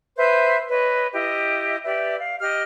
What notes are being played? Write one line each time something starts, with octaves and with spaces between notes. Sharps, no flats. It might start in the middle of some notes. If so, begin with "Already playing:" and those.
B4 C5 E5 G6
B4 C#5 D#5
E4 G4 D#5
G4 B4 D5 E5
F5
G4 D#5 F6